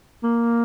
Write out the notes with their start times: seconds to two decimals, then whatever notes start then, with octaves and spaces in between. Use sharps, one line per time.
0.23 A#3